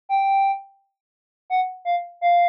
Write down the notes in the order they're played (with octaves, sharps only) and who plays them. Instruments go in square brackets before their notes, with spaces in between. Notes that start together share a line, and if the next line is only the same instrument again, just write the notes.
[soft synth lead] G5
F#5
F5
F5